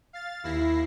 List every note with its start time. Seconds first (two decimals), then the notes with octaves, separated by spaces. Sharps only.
0.13 F5 A6
0.44 D#2 E4 A#6 C7